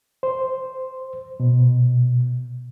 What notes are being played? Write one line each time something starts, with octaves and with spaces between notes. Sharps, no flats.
C5
B2